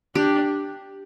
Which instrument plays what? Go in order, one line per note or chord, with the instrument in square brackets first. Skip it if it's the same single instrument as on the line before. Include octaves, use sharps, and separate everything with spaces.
[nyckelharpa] D4 [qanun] G4